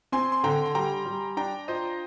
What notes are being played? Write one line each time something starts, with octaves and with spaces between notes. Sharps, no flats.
C4 G#5 C6
C6
D3 G5 A#5
C6
G3 G5 A#5
G3
D4 G5 A#5
F4 C5 D#5